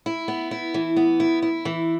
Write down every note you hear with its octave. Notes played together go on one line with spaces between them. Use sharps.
E4
B3
E4
E3
B3
E4
E4
E3